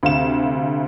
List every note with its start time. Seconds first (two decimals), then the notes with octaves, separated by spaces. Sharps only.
0.03 D2 C3 F5 E7